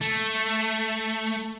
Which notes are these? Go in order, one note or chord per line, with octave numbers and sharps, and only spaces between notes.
A3